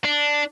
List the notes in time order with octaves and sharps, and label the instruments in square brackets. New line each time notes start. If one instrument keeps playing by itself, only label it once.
[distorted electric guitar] D4